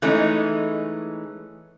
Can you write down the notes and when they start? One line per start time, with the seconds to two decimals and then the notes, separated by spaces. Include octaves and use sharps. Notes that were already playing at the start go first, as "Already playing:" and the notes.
0.02 E3 G#3 A3 C#4 D#4